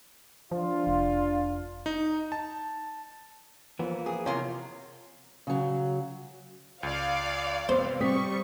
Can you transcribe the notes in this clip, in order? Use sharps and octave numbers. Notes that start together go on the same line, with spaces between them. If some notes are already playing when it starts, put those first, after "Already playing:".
F3 D4 F4
F1
D#4
A5
E3 F3 A#3 B3
G#4
C3 F4 A#4 C#5
C#3 F#3
C#2 D5 F5
C3 B3 C4 C5
G3 C4 C#6 D#6 B6